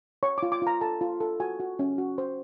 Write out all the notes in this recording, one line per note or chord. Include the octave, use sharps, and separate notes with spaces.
C#5 C#6
F4 D6
D6
F4 A#5
A4 A5
F4
A4
F#4 G#5
F#4
C#4
F#4
C5